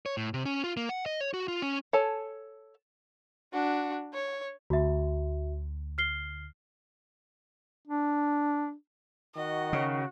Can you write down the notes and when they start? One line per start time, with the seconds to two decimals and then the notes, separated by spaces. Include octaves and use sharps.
0.06 C#5
0.17 A2
0.34 C3
0.45 C#4
0.64 F4
0.77 A#3
0.89 F#5
1.06 D#5
1.21 C#5
1.34 F#4
1.48 F4
1.62 C#4
1.93 A4 C#5 G#5 A5
3.53 D4 F#4
4.14 C#5
4.70 D2 F#4 E5
5.98 F6 C7 G7
7.88 D4
9.36 D#3 F#4 D#5
9.73 C#3